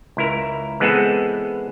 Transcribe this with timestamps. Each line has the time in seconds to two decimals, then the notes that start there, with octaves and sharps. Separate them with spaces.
0.17 C#2 E4 A#4
0.80 E3 G#3 B3 C4 G#4 A4